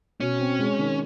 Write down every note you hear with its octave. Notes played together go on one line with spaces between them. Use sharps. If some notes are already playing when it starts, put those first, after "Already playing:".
B2 C#4
C4
G#3
D#3